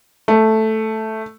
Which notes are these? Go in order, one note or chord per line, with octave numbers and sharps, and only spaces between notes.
A3